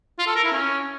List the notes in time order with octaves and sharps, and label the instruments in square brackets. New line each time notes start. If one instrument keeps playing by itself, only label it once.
[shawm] F4
A4
A#4
E4
C#4